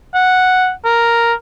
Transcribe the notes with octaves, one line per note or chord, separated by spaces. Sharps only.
F#5
A#4